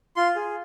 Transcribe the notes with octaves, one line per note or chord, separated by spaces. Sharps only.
F4 C6
G#4